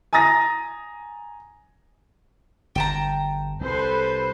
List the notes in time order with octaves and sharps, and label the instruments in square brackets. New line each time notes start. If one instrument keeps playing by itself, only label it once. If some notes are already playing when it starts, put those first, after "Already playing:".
[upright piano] G#5 A#5 D#6 A6 A#6
[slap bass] G1 [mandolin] G5 A5 A#5
[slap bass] C2 [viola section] A4 B4 C5